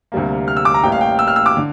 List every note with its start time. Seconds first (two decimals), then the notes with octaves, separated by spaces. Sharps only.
0.12 D2 C3 G3 A#3
0.48 F6
0.57 E6
0.65 D6
0.74 A#5
0.83 A1 A2 G3 A#3 G5
0.92 F5
1.01 G5
1.19 E6
1.28 F6
1.36 E6
1.46 D6
1.57 D3